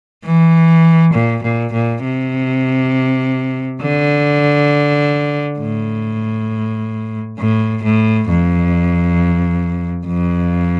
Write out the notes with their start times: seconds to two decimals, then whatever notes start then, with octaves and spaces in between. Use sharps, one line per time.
0.25 E3
1.14 A#2
1.43 A#2
1.73 A#2
2.03 C3
3.81 D3
5.60 A2
7.39 A2
7.83 A2
8.29 F2
10.07 F2